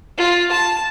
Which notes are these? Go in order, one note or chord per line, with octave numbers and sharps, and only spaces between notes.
F4
A5